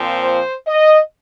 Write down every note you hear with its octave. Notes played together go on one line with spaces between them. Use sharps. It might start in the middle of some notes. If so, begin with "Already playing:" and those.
Already playing: A#2 F3 C4
C5
D#5